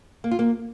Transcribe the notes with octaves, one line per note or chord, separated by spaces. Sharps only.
A#3
F4
A#3